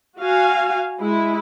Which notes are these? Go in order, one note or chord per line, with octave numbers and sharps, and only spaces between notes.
F#4 F5 G#5
G#3 E4